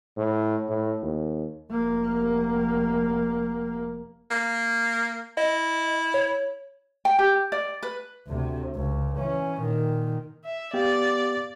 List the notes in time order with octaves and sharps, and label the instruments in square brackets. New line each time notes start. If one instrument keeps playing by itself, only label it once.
[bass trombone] A2
A2
D#2
[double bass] F1 A#3
[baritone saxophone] A#3
[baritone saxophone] E4 [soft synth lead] D#5
[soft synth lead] C#5
[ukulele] G5
G4
D5
B4
[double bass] D2 C3
C#2
E3 C#4
A#2 D#3
[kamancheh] E5
[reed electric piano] B3 G4 F5 [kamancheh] D5